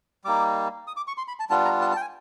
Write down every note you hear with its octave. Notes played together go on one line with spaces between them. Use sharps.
G3 A#3 D#4 D6
D#6
D6
C#6
C6
B5
A5
G3 B3 D4 F4 A5
A#5
A5
A5
G5
G#5